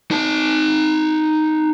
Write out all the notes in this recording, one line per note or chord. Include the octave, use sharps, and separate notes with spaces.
D#4 A5